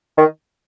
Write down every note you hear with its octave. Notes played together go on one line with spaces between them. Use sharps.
D#3